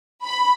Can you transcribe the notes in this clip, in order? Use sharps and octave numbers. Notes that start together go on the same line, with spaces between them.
B5